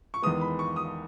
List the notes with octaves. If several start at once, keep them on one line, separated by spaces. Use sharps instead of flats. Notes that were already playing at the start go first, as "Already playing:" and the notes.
C#6
E2 D#3 G#3 B3 D#6
B5
C#6
D#6